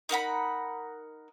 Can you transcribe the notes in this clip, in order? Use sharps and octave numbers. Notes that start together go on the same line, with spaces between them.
D#4 A#4 F#5 B5